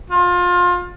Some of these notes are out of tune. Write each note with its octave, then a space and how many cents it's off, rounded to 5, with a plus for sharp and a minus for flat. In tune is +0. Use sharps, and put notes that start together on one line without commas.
F4 +25